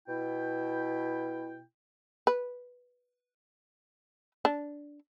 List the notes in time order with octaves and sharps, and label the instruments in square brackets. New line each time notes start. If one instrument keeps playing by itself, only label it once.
[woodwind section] B2 E4 G5
[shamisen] B4
D4